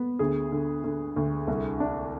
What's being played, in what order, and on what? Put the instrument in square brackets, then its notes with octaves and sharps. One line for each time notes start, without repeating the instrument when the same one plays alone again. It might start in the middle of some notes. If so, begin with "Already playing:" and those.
Already playing: [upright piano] B3
D2 G#4
D3
D3
D2
C2
D4